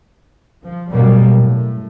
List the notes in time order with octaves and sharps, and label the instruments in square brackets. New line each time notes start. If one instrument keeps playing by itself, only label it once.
[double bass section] F3
F#2 B2 G3 A#3
A2